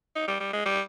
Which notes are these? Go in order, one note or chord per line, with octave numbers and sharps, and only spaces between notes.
D#4
G3
G3
G#3
G3